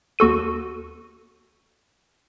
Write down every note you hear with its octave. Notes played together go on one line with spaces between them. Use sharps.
D#2 F#4 A4 D#7